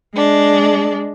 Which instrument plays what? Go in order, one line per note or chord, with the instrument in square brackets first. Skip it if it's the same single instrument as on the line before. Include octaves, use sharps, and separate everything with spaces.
[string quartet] G#3 D4